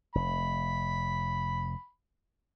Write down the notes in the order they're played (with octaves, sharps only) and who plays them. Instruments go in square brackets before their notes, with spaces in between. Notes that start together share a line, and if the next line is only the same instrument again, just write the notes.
[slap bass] F1 [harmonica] B5